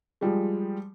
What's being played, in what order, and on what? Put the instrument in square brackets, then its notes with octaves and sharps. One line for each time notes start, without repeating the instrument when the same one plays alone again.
[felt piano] F3 G3 G#3